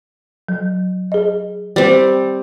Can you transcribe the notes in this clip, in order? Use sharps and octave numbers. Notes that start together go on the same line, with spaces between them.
F#3
G#4 D#5
G3 C4